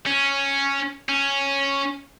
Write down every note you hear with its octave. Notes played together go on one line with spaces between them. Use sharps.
C#4
C#4